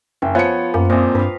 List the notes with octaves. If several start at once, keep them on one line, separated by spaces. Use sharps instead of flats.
F#1 G5
F3 B3 C#5 C#7
F#2 A#3
F2 A#2 C5 D#5
G2 B4 F5